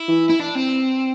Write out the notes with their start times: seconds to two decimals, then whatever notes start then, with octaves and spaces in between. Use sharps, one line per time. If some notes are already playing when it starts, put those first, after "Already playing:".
Already playing: E4
0.08 E3
0.30 E4
0.40 D4
0.55 C4